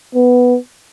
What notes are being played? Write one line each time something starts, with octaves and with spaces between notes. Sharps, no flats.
B3